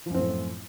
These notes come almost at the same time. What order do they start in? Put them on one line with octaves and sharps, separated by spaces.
F3 F#2 C4 A2